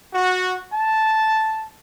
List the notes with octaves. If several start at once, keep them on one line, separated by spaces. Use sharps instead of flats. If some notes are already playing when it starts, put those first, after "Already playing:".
F#4
A5